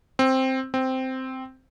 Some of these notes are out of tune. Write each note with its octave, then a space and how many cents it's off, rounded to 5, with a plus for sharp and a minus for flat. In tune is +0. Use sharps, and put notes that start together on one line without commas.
C4 +5
C4 -5